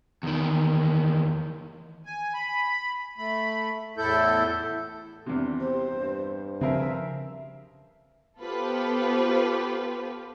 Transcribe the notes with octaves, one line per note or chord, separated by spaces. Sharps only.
E2 D#3
G#5
B5
A3 B5
E2 A2 E4 A4 G6
E2 C3 D4
G4 C5
G2
C#3 F3 C4 G#4 A#4 E5
B3 F4 G4 A4 B4 C5